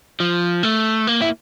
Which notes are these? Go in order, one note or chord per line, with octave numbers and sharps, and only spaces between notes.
F3
A3
A#3
E4